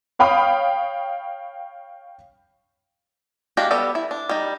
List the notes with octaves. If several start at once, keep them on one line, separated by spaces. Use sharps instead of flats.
C#5 F5 G5 B5 D#6 F6
G#3 D4 F#4 G4 F5
G3 B3 A4 D5
E4
D4
G3 D#4